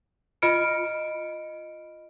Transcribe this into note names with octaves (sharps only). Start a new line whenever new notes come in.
F4 D#5 B5 F6 C#7 D7